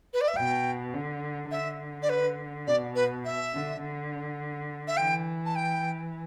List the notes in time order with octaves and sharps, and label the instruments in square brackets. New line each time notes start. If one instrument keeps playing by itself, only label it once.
[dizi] B4
D5
E5
[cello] B2 [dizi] G5
[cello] D3
[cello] D3 [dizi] E5
[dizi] D5
B4
[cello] B2 [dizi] D5
[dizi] B4
E5
[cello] D3
D3
[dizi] E5
[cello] E3 [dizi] G5
[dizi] A5
G5